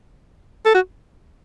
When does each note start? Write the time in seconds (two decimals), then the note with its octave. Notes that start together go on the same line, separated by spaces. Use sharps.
0.66 A4
0.75 F#4